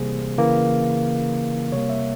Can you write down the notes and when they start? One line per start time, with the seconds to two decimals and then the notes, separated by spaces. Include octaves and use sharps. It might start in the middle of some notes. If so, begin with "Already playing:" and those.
Already playing: C3 E3 G3 A#3 G#4 C5
0.38 C#3 E3 A#3
1.72 C3 G3 A#3 C#5
1.89 E5